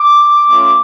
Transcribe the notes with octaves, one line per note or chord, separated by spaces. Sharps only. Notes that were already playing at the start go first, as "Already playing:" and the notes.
Already playing: D6
A3 C#4 F4